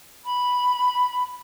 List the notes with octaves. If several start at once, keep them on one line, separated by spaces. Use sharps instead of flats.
B5